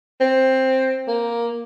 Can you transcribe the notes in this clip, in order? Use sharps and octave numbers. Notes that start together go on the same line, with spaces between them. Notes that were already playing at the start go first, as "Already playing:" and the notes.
C4
A#3